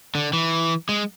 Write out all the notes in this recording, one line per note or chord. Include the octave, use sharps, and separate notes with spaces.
D3
E3
G#3